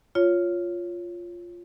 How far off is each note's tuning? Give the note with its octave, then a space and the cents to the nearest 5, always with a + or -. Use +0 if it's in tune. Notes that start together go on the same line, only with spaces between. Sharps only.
F4 +0 C#5 +5